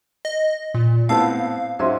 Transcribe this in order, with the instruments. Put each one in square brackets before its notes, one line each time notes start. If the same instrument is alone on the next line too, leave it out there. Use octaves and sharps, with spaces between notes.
[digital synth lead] D#5
A#2
[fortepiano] A2 B3 C4 [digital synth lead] F5 [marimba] A5 E6
[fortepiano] G#2 F#3 C#4 [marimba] C5 E5 C6